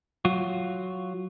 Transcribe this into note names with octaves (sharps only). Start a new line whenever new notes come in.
F#3 F4 F#4